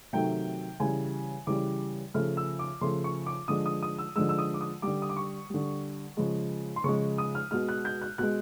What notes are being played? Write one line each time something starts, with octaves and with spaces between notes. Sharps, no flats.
C3 D#3 F#3 A3 G5
C#3 E3 G3 G#5
C#3 E3 G3 D6
C#3 F3 A3 F6
E6
D6
C#3 F3 A3 C6
C#6
D6
D3 F3 G#3 D#6
D#6
D#6
E6
D3 F3 G#3 E6
E6
D#6
D6
D#6
D3 G3 D6
D#6
D6
C#6
D3 G3
C#3 F3 G#3
C6
C#3 F3 G#3 C#6
D#6
F6
B2 G#3 F6
F#6
G6
F#6
B2 G#3 F#6